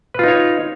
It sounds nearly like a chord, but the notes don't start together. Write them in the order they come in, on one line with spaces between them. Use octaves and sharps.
B4 F4 D#4 C#5